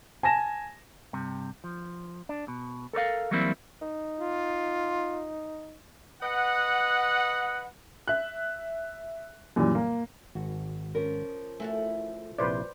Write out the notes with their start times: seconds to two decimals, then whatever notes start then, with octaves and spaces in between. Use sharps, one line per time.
0.23 G#5 A5 A#6 E7
1.13 G2 C3
1.64 F3
2.29 D4
2.48 B2
2.93 A4 A#4 C#5 F5
3.31 E3 F#3 G3 A#3 C4 E4
3.82 D#4
4.20 F4
6.23 B4 D#5 F#5
8.08 E5 F#6
9.56 F#2 A#2 E3 G3
9.75 A#3
10.35 G#1 F#4
10.95 F3 C#4 A#4
11.60 A3 E4 F#4 A4 G#5
12.38 A#1 C3 E4 B4 C5 D5